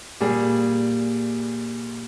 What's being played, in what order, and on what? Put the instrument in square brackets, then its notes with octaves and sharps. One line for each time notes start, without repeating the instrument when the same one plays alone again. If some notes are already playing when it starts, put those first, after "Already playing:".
[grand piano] A#2 G3 G#4